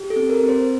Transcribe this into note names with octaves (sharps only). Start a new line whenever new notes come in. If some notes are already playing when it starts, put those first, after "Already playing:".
Already playing: G4
A4
C4
A#4
C4
C5